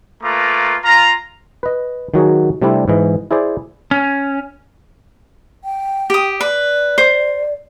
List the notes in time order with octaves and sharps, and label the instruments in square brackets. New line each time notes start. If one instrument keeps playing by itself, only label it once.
[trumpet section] A3 A#3 F4 B4 A#5 D6
F4 A#5
[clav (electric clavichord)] B4 D#5
D#3 F#3 F#4 G#4
C3 G3 A3 C4 D4 E4
G#2 E3 D#5
E4 G#4 C5 D5
[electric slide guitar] C#4
[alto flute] G5
[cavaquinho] G4 D#6
[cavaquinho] B4 [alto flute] D5
[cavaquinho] C5